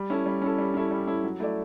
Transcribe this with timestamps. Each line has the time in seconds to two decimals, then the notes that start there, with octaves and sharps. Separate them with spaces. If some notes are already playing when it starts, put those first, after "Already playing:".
Already playing: G3
0.10 C#4 E4 A4
0.26 G3
0.42 C#4 E4 A4
0.58 G3
0.74 C#4 E4 A4
0.91 G3
1.07 C#4 E4 A4
1.24 F#3
1.40 A3 E4 A4 D5